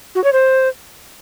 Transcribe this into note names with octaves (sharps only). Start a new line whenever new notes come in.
F#4
C#5
C5